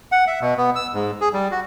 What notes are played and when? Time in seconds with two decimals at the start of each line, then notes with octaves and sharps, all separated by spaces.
0.12 F#5
0.27 E5
0.41 B2
0.57 B3
0.76 E6
0.93 G#2
1.21 G#4
1.34 G3
1.51 F#4